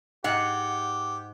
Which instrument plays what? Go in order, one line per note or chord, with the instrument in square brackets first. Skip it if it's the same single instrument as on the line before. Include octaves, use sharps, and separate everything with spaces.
[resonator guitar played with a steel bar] G#2 F#5 [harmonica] G4